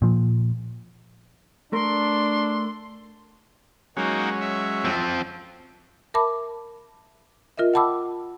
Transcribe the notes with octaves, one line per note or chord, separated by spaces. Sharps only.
A#2 F3
A3 D4 A#4 C6
F#3 G#3 A#3 C#4 D#4 F#4
E5
F3 C4
A#4 E5 A5 B5 D6
F4 A#4 D#5 E5
F#5 G5 A5 B5 D6 E6